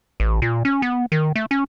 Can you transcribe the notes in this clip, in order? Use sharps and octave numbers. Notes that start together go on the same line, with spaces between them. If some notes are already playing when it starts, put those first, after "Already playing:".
A1
A#2
C#4
B3
D#3
A3
C#4